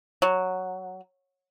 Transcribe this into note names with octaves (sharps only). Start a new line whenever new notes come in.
F#3